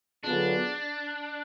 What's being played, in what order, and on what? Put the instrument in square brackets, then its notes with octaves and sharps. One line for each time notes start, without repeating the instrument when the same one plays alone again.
[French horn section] D3 F#3 B3 F4 G#4 [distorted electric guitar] D4